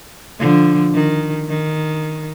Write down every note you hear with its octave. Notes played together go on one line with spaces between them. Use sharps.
D3 F3
D#3
D#3